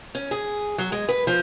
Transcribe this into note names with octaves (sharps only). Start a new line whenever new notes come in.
C#4
G#4
F#3
G#3
B4
F3